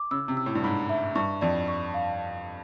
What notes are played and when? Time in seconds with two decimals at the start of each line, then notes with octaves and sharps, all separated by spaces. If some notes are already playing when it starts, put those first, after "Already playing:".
Already playing: D6
0.11 C#3 E6
0.28 C3
0.37 E6
0.46 A2
0.55 G2
0.64 G#2 B5
0.89 E5
1.15 G2 C#6
1.41 F2 D5
1.68 C#6
1.94 F5